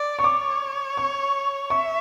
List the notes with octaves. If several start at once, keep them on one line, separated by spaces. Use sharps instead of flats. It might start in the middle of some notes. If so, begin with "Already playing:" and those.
Already playing: D5
C#6
C#5 D6
C#6
E5 C#6